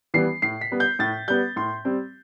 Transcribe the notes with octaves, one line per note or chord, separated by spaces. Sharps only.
E3 G3 B3 C7
A2 C7
B6
G3 B3
G6
A2 A6
G3 B3 G6
A2 C6
G3 C4